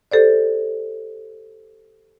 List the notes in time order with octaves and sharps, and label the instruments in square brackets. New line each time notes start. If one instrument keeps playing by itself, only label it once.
[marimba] G4 A4 C5 D5